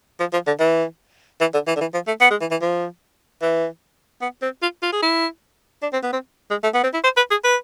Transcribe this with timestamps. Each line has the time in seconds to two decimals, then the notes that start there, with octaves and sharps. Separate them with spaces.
0.20 F3
0.33 F3
0.47 D3
0.59 E3
1.41 E3
1.53 D3
1.67 E3
1.76 D3
1.80 E3
1.94 F3
2.07 A3
2.20 B3
2.31 G#3
2.41 E3
2.51 E3
2.61 F3
3.42 E3
4.21 B3
4.42 C4
4.62 F4
4.82 F4
4.92 G#4
5.02 E4
5.82 D4
5.93 C4
6.03 B3
6.13 C4
6.50 G#3
6.63 A3
6.74 B3
6.83 C4
6.94 E4
7.04 C5
7.17 B4
7.31 G#4
7.44 B4